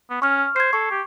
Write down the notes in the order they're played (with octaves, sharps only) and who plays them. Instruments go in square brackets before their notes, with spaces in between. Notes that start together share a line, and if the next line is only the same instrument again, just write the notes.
[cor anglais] B3
[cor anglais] C#4 [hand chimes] C#6 F6
[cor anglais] C5 [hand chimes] G#6 C7
[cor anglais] A4 [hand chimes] C#6
[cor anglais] G4